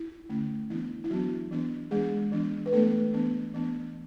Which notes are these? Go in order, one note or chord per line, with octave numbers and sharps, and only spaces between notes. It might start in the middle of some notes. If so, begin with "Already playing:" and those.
Already playing: E4
D3 A3 C#4
E3 B3 D4 E4
E4
E3 F#3 B3 D4 F#4
E3 B3 D4
E3 G#3 B3 D4 G#4
E3 B3 D4
B4
E3 A3 B3 D4 A4
E3 B3 D4
E3 B3 D4